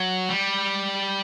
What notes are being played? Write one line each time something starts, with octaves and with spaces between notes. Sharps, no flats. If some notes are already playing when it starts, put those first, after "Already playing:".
Already playing: F#3
G3